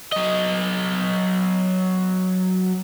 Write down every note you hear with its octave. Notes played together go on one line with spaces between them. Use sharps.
F#3 D#5